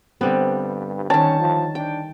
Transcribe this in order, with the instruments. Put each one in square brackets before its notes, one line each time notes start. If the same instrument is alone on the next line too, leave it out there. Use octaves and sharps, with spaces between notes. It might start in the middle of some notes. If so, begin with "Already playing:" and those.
[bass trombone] G2 [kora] D3 G3 B3 [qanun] C4
[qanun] D#3 C#5 [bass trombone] C#4 [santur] A5
[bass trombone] F3
[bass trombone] D4 [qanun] G5